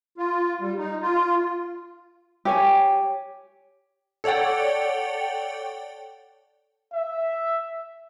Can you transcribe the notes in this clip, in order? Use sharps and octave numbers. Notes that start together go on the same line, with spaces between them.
F4
G3
D#4
F4
G4 C#5 G#5
A4 C#5 D5 F#5 G5
E5